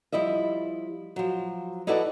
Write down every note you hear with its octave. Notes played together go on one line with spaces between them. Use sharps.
F3 G3 E4 D#5 E5
F3 F#3
D#4 E4 F#4 A4 B4 D5